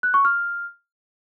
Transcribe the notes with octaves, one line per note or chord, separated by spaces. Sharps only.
F#6
C#6
F6